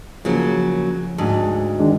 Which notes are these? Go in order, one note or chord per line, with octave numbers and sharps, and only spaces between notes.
C#3 F3 F#3 A#3
D2 G#2
D#3 G#3 D4